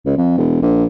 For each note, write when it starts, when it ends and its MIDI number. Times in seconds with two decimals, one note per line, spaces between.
0.06 0.15 37
0.17 0.35 41
0.38 0.58 28
0.62 0.85 34